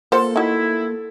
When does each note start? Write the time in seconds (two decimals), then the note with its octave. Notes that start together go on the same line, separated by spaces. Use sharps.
0.12 A#3 F4 A4 C5 F#5
0.36 D#4 E4 F#4